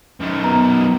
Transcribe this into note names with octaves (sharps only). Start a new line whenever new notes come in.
F#2 D#3
B3 A#5